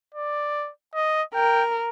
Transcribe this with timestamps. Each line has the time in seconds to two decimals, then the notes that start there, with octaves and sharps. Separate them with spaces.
0.14 D5
0.95 D#5
1.35 A#4 G5